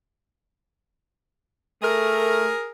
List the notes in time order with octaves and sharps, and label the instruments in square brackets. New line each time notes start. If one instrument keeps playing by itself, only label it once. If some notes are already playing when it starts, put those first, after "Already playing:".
[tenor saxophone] A3 [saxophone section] G#4 A#4